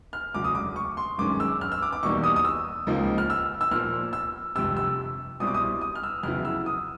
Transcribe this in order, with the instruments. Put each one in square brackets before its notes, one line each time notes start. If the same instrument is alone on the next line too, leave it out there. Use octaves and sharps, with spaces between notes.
[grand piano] F6
E1 D2 C#3 F#3 D6
D#6
D6
C#6
C6
G1 F#2 D#3 G#3 C#4 D6
E6
F6
E6
D6
D6
E2 B2 G3 A#3 D#4 C#6
D#6
D#6
E6
C#2 C#3 F3 A#3 D#4
F6
E6
E6
A#2 F3 A#3 F6
E6
G1 F2 C3 E6
E6
C2 B2 G3 C4 E4 D#6
D6
D#6
D#6
F6
E6
F2 C#3 F#3 B3 E4 F6
E6
D#6